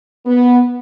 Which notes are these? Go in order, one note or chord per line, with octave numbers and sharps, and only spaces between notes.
B3